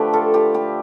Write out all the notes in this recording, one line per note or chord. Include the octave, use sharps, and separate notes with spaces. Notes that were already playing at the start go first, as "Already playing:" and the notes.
Already playing: D3 F3 A3 G4 B4
F4 A4
G4 B4
G4 B4